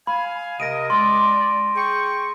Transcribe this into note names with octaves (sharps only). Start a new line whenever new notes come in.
F5 G#5 B5
C3 A#4 D#5 A#6 D7 D#7
G#3 D5 C6
G#4 G5 C#6